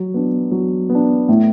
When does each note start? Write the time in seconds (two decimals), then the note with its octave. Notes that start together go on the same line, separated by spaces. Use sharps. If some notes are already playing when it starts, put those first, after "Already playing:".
Already playing: F#3
0.14 B3 D4
0.51 F#3
0.90 B3
0.95 D4
1.29 A2